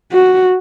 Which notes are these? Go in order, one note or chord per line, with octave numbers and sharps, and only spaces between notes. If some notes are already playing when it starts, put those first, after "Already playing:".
F#4